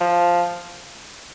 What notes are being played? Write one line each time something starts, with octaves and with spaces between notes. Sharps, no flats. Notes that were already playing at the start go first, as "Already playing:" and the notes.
F3